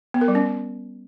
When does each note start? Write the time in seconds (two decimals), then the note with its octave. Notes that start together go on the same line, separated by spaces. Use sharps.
0.14 B3
0.21 A#4
0.28 G3
0.35 C#4